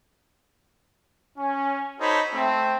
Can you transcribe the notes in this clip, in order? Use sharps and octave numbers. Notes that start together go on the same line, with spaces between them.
C#4
D#4 F#4 A4 C5 C#5 B5
A3 C4